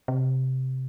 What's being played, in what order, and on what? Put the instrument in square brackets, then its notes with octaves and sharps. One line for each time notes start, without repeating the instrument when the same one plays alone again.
[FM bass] C3